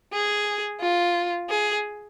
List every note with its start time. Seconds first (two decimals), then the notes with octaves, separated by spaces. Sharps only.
0.13 G#4
0.81 F4
1.50 G#4